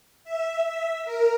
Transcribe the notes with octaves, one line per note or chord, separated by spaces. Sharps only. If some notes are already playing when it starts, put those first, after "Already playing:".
E5
E5
A#4